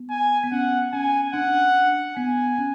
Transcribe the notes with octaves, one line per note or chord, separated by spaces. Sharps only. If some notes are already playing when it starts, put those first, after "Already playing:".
Already playing: B3
G#5
B3
C#4 F#5
C#4 G#5
D4 F#5
B3 G#5
C#4